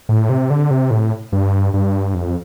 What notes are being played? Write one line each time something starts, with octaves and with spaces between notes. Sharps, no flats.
A2
C3
D3
C3
A2
G2
G2
F2